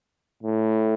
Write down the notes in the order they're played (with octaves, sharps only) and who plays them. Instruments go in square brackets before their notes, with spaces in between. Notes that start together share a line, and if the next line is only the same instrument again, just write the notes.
[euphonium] A2